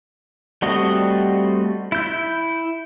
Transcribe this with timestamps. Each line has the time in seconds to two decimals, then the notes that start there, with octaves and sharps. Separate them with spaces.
0.62 G3 A3 C4 F#4 D#5
1.92 E4 G6